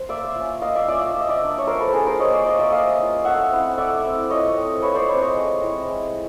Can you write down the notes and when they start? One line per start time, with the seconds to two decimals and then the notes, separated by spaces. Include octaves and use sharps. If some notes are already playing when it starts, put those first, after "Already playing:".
Already playing: C5
0.09 A#3 D5 E5
0.35 C#4 F4
0.62 A#3 D#5 F5
0.75 D5 E5
0.88 C#4 F4 D5 E5
1.02 F5
1.11 F3 E5
1.20 D#5
1.29 D5 E5
1.41 A#3 D4
1.58 C#5
1.67 F3 A#4 C5
1.80 A4 B4
1.93 A#3 D4 G#4 A#4
2.06 A#4 C5
2.20 A#3 C#5 D#5
2.33 C5 D5
2.46 C#4 F4 C#5 D#5
2.59 D5 E5
2.72 A#3 D#5 F5
2.98 C#4 F4
3.25 A3 E5 F#5
3.51 C4 E4
3.77 A3 D5 E5
4.03 C4 E4
4.30 F3 C#5 D#5
4.57 A3 C4
4.82 F3 B4 C#5
4.95 C5 D5
5.08 A3 C4 B4 C#5
5.22 C#5 D#5
5.35 G#3
5.61 C4 E4
5.87 G#3